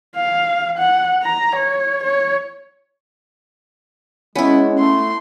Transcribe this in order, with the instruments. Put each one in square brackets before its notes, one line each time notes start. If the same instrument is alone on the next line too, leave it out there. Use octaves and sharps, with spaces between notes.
[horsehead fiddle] F5
F#5
A#5
C#5
C#5
[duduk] G#3 [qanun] B3 E4 [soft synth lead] C#4
[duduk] A3 [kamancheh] C6